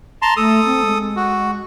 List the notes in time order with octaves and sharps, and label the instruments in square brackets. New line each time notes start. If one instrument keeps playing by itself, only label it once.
[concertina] A5 A#5 C6
[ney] A3 [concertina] A4 D#6
[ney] C4
G#3
[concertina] F#4